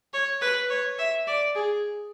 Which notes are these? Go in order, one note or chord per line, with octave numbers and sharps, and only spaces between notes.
C#5
B4
C#5
E5
D5
G#4